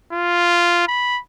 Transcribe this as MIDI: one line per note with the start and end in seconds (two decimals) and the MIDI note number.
0.13 0.85 65
0.88 1.19 83